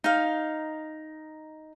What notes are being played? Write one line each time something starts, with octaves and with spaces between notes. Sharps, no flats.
D#4 F5